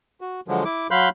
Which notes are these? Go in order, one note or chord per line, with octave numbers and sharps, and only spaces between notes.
F#4
D3 F3 F#3 G#3
E4 D6
F#3 F5 B5 C6 F#6 G6